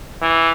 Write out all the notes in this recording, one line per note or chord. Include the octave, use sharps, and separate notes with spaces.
E3